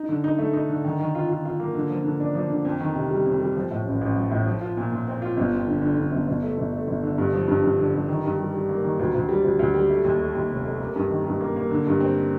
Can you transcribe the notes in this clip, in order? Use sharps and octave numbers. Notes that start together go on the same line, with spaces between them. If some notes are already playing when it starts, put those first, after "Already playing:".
Already playing: D#4
D3
D#4
A3
D#4
D3
D#3
D#3
F4
F4
F4
A#3
D3
F3
D3
D4
F3
D3
F2
D#3
C3
G3
F2
G3
F3
A2
A1
A1
F3
A2
F3
F4
A#2
A#2
C4
F4
G1
F2
D3
D3
D3
G1
G1
A3
G1
A3
G1
D3
G2
F3
G2
G2
D3
G2
D#3
G2
G3
G3
A#3
D#3
D2
D2
G3
D2
D2
G3
A3
D#2
A3
D#2
F1
A3
A#3
G2
D#3
G2
A#3
A#3
D3
G2
C4